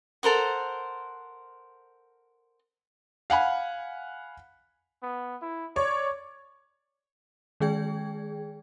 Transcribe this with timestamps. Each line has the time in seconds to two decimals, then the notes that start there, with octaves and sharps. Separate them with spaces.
0.23 A4 A#4 C5 F#5
3.30 F5 F#5 G#5 B5
5.03 B3
5.42 E4
5.76 C#5 D5
7.60 D#3 G#3 G#4 G5 G#6